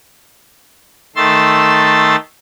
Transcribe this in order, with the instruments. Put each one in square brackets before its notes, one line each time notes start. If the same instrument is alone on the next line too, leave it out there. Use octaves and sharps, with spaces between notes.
[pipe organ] D#3 A3 C6 E6 A6